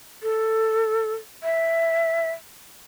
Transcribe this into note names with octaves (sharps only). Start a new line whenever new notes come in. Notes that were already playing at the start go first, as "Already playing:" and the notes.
A4
E5